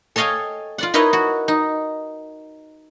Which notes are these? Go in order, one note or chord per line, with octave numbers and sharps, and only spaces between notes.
A4 C#5 D#5 F5 G5 G#5
F4 D5 F#5
D#4 E4 A#4 B4 C#5 D#5
F#4
D#4